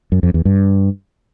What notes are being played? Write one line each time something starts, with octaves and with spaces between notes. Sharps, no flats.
F#2
F2
E2
G2